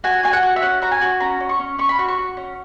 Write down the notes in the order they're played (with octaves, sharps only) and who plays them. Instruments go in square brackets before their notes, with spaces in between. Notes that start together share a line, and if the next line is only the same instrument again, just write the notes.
[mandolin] F#4 G#5
F#4 G#5
F#5
F#4
E5
C#4 F#5
F#4 A#5
G#5
F#4
C#4 A#5
C#4
C#6
C#4
C#4 C#6
B5
F#4 C#6
C#6
F#4
C#4